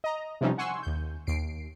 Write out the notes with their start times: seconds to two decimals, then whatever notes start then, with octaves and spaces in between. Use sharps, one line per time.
0.04 D#5 A#5
0.41 C3 E3 F3 G3 C#4 D#4
0.58 F#5 G#5 C6 C#6 E6
0.83 D#2 G6
1.27 D#2 C7 D7